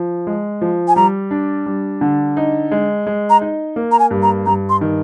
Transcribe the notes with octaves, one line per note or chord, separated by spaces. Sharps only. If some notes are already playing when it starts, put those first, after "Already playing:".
Already playing: F3
G#3
F3
G#5
G3 A#5
D4
G3
D3
D#4
G#3
G#3
A#5
D#4
A#3
A#5
G#5
G2
A#5
G2 A#5
C6
D#3